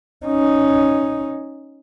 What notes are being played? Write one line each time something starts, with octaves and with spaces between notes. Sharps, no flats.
C#4 D#4